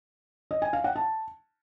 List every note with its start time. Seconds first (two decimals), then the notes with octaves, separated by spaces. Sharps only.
0.51 D#5
0.62 G#5
0.73 F5
0.84 F#5
0.96 A5